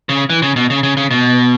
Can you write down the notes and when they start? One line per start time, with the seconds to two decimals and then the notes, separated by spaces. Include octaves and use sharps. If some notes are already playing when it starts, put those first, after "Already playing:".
0.09 C#3
0.30 E3
0.42 C#3
0.56 B2
0.70 C#3
0.83 C#3
0.97 C#3
1.11 B2